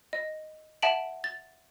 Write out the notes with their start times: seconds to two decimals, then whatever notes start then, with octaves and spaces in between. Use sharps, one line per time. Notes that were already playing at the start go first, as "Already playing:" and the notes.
0.13 D#5
0.82 E5 F#5 A5 D7 F#7
1.24 A6